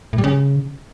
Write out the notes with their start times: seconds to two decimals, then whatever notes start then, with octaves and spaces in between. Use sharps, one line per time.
0.13 A2
0.18 G3
0.24 C#3